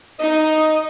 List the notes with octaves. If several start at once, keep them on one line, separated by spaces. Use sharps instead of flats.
D#4 D#5